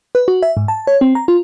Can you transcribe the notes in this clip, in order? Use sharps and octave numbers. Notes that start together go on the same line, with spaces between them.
B4
F#4
E5
G#2
A5
C#5
C4
A#5
F4